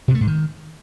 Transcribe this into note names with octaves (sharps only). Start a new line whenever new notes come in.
C3
A3
G#2
D#3